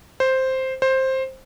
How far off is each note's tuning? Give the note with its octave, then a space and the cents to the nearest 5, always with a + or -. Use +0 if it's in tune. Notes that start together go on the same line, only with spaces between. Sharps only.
C5 +0
C5 +10